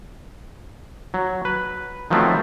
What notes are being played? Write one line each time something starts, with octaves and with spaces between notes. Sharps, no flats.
F#3
B4
D#3 F3 F#3 A3 B3 C4